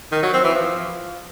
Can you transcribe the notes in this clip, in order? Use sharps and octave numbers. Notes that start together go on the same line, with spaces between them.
D#3
F#3
C4
E3
F3